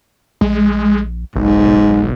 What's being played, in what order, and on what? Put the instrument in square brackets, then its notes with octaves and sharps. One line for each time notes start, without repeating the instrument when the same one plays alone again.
[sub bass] A#1 [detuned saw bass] G#3
[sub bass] F#1 [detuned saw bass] B1 [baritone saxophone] G#2